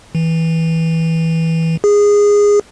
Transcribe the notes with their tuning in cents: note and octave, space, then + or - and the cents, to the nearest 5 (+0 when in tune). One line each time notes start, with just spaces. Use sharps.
E3 -15
G#4 -15